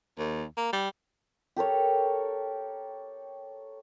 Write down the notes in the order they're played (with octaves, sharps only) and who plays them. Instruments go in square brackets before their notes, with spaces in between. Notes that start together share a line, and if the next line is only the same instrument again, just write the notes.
[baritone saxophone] D#2
A#3
G3
[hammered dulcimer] G4 A4 A#4 C#5